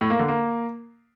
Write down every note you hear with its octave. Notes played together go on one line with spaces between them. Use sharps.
A2
A#3
D3
A#3